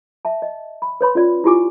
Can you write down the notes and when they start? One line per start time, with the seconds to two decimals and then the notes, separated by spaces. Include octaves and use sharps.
0.25 E5 A5
0.42 D#5
0.82 B5
1.01 B4 C#5 B5 C6
1.15 C#4 F4 C#5 D5
1.44 E4 F4 G4 G#5 D6